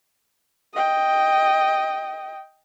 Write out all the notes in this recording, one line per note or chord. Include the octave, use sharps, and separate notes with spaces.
D#5 G5